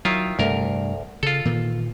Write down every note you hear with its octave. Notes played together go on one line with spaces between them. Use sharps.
D#3 F#3 E4 F4
D2 G2 C3 A3 A#4
C#3 F4 A4
A#2 D#3 E3